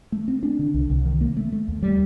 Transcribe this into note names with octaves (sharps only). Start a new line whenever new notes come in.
A3
C4
D4
D3
C2
C2
D#3
A#3
A3
A3
D#2
G3